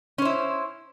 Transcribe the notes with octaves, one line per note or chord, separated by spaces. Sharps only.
C#4 E4 C5